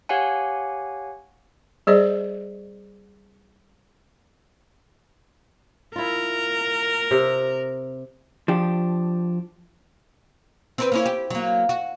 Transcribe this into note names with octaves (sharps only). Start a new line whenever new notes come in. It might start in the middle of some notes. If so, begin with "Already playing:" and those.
G4 C#5 F5 F#5 G#5
G3 G#4 C5 D5 D#5
E4 F4 A#4
C3
F3 D4 G4
C4 A#4 B4
A#3 C#4 E4
G4
F#3 A#3
F#4